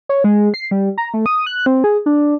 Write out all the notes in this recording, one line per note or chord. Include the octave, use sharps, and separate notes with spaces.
C#5
G#3
C7
G3
A#5
A3
D#6
F#6
C4
G#4
D4